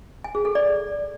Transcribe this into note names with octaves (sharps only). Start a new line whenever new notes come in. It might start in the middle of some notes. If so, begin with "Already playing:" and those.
G#5
G#4
A4
D5